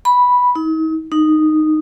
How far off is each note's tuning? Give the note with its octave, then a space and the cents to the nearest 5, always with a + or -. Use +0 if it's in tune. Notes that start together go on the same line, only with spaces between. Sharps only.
B5 -5
D#4 +40
D#4 -10